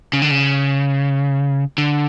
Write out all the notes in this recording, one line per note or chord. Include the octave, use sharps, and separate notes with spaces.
C#3
D3
C#3
D3